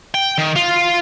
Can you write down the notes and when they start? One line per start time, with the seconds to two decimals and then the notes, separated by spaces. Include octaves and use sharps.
0.14 G5
0.38 D#3
0.56 F4